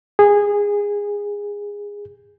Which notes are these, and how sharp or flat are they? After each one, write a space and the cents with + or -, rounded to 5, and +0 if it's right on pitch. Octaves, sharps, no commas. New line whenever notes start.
G#4 -20